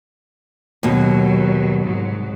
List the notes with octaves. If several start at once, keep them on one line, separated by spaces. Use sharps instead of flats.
D#2 B2 F#3
C2 G#2 F#3